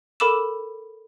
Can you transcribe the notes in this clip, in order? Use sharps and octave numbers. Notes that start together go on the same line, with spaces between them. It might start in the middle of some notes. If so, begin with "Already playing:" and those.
A4 A#4 B5 D6 E6 E7